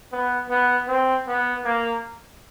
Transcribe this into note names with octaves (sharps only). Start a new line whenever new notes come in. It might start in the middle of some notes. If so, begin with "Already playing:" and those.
B3
B3
C4
B3
A#3